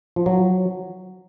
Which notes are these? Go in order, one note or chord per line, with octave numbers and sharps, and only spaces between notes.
F3
F#3